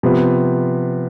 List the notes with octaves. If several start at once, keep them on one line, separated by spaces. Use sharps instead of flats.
C3 F3 B3